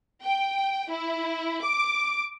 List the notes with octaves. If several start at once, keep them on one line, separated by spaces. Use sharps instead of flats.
G5
E4
D6